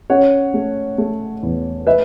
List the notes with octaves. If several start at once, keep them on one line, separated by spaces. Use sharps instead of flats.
C#4 C#5 F#5
A3
A3
E2
B4 E5